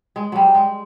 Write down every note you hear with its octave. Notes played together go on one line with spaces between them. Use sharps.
G#3
F#3 G3
G#3